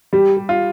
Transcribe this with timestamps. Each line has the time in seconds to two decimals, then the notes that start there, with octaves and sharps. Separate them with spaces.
0.13 G3 G4
0.37 G4
0.49 F4